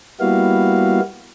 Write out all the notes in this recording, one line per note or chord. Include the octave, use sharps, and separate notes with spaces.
G3 A#3 B3 E4 F#4 F5